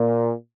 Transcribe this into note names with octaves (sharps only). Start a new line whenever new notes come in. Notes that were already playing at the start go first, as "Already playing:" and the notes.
Already playing: A#2